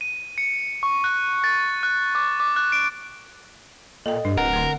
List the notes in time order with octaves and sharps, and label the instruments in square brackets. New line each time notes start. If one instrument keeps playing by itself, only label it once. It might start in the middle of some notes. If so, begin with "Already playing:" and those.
[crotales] D#7
C#7
C#6
F#6
A6
F#6
D6
D6
F#6
D7
[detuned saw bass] A#2 [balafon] A4 G5 [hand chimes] D#5
[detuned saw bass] G2 [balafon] D4
[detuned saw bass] D1 [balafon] C4 B4 [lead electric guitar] A#4 [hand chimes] F#5
[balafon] D3 A3